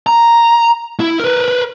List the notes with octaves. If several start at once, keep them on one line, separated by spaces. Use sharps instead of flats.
A#5
E4
A#4 B4